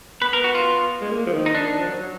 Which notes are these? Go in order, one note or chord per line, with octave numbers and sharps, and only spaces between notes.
B3 B4
A#4
F#4
F4
G#3
A#3
F3
D#3
D#4
D4
D#3
F3
F#3
F#3